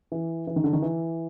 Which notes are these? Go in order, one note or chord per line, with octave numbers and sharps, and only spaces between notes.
E3
E3
D#3
D3
D#3
E3